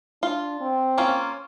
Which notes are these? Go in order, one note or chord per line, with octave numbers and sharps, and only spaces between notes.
D4 F4
C4
A#3 C#4 F4